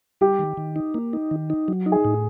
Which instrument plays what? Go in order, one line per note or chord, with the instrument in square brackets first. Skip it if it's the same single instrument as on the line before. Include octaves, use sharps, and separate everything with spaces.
[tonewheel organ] G3 [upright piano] G4
[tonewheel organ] D#3
D#3
D#4
A#3
D#4
D#3
D#4
F#3
D#4
[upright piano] G#4
[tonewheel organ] A2